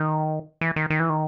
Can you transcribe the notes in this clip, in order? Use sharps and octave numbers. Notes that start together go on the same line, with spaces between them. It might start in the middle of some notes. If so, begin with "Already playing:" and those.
Already playing: D#3
E3
D#3
D#3
E3
D#3